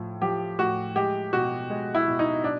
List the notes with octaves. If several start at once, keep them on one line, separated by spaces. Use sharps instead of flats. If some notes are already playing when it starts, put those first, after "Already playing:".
Already playing: A2 F3
F3 G4
A2 F#4
G#3 G4
B2 F#4
G#3
E4
B2
D#4
D4